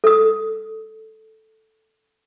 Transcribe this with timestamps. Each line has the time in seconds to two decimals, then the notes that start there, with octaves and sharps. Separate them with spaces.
0.04 A4 D#6